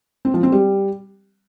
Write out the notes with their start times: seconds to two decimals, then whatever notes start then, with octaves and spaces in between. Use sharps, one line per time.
0.25 C4
0.34 F3
0.43 C4
0.52 G3